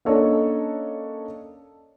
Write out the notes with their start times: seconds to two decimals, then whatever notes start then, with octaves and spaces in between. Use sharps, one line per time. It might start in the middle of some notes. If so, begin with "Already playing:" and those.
0.05 A#3 C#4 D4 A4 C#5 D#5